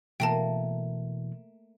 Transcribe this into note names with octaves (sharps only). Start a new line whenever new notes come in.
B2 E3 A3 A#3 A#4 G5 A5